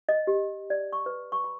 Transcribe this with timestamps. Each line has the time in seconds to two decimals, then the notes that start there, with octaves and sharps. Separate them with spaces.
0.09 D#5
0.27 G4
0.70 D5
0.93 C#6
1.06 B4
1.32 C#6
1.44 B5